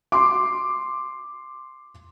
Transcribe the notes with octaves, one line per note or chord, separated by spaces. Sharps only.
C6 D6